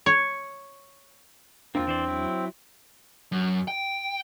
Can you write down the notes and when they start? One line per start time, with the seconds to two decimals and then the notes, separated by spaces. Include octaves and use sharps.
0.06 C#5
1.75 E2 A#3 C4 D4 E4 F4
1.87 E3 C5 D5
2.07 F#3 E4
3.32 F#2
3.68 G5